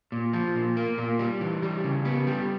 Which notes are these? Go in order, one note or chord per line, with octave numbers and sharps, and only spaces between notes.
A#2
F3
A#2
A#3
A#2
G3
E3
G3
C#3
B3
G3